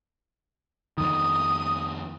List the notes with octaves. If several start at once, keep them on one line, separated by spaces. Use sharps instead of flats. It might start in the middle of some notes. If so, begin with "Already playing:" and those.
F2 D#3 D#6